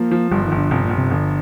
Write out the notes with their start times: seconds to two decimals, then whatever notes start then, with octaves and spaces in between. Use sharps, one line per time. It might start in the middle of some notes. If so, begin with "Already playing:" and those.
Already playing: F3 A#3
0.11 F3
0.31 G1 G3
0.45 D#3
0.52 G1
0.58 D3
0.71 G1 C3
0.85 A#2
0.91 G1
0.98 C3
1.11 G1 D3